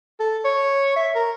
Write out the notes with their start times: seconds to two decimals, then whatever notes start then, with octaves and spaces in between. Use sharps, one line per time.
0.20 A4
0.45 C#5
0.96 E5
1.16 A#4